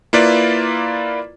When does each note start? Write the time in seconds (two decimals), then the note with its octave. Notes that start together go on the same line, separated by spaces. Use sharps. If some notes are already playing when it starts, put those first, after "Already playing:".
0.13 A#3 E4 F4 B4 D5